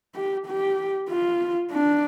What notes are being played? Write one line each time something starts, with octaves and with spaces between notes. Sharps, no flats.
G4
G4
F4
D4